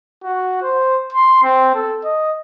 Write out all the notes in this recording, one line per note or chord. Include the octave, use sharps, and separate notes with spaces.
F#4
C5
C6
C4
A4
D#5